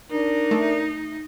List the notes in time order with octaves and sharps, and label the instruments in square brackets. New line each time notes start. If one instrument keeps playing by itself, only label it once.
[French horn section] D4 A#4 [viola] D#4
[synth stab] A3